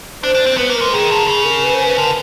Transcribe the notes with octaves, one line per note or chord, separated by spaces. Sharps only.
D4 C5
D4
C4
B3 B4
A#3
A#4
G#3
D#3 G#4
D3
C#3 G#4
A#4
B4
C5
B4
D3 A#4